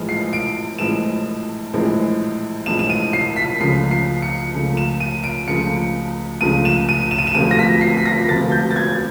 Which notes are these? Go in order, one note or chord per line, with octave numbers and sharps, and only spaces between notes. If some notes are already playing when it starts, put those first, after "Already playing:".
Already playing: A#1 A2 E3 G#3
C7
D7
A#1 A2 E3 G#3 E7
A#1 A2 E3 G#3
A#1 A2 E3 G#3 E7
E7
D#7
C7
B6
C#2 C#3 F3 A3 C7
C7
C#7
C#2 C#3 F3 A3
E7
D#7
D7
C#2 C#3 F3 A3 C#7
C#2 C#3 F3 A3 D#7
E7
D#7
E7
D#7
E7
E1 D2 C3 F3 A3 D#7
A#6
B6
C7
B6
A#6
E1 D2 C3 F3 A3 A6
G6
A6
G#6